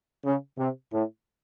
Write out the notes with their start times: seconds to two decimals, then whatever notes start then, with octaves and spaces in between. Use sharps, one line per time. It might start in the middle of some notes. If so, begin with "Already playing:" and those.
0.24 C#3
0.58 C3
0.92 A2